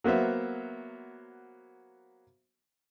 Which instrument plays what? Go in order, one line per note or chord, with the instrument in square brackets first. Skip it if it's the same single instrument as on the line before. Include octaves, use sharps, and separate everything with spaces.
[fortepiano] F#3 A#3 B3 C5 E5